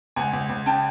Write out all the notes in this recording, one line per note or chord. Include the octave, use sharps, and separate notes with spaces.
C#2 F#5 G#5
C#2
C#2
C#3 G5 A5